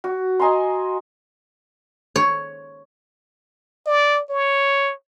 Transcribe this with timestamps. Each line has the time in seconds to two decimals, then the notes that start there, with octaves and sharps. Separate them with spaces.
0.04 F#4
0.39 D#5 G#5 A#5 C6
2.16 C#5
3.87 D5
4.30 C#5